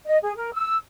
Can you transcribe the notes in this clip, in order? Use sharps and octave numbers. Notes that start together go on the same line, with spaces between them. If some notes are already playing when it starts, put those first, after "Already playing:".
D#5
G#4
A#4
E6